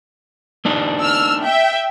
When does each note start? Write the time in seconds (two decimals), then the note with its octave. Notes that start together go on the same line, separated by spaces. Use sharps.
0.65 A#3 D4 D#4
1.01 E6 F6
1.42 E5 G5